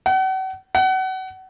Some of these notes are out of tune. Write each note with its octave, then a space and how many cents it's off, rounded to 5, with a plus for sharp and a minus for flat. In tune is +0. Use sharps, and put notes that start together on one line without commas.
F#5 +40
F#5 +30